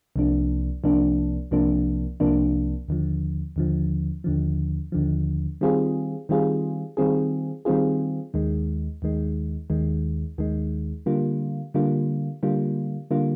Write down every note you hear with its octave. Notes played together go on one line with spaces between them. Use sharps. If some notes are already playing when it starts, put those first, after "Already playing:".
C2 C3 F3 A#3 D4
C2 C3 F3 A#3 D4
C2 C3 F3 A#3 D4
C2 C3 F3 A#3 D4
D#2 D3 F3
D#2 D3 F3
D#2 D3 F3
D#2 D3 F3
D#3 G3 C4 F4 G#4
D#3 G3 C4 F4 G#4
D#3 G3 C4 F4 G#4
D#3 G3 C4 F4 G#4
D#2 D#3 G#3
D#2 D#3 G#3
D#2 D#3 G#3
D#2 D#3 G#3
D3 G3 A#3 F4
D3 G3 A#3 F4
D3 G3 A#3 F4
D3 G3 A#3 F4